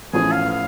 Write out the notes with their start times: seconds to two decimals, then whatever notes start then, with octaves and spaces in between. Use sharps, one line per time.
0.13 A1 A2 F3 A3 C#4 G#4
0.32 F5
0.50 F5